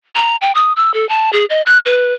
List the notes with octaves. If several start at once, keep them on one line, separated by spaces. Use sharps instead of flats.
A#5
G5
D#6
E6
A4
A5
G#4
D#5
F#6
B4